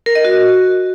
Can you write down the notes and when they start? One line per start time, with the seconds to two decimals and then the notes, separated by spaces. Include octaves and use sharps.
0.06 A#4
0.15 D#5
0.25 F#4